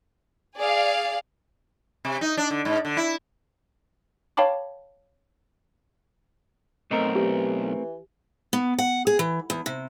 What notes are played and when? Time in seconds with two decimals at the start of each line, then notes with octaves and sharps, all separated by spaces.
0.57 G#4 D5 F5
2.05 C3
2.21 D#4
2.37 D4
2.51 D3
2.65 G#2
2.85 D3
2.97 E4
4.37 C#5 F5 G5 A5 B5 D6
6.91 B1 A3 C4 D#4 A#4
7.15 E3 G4
8.53 B3
8.79 F#5
9.07 G#4
9.19 E3
9.50 E2
9.66 C3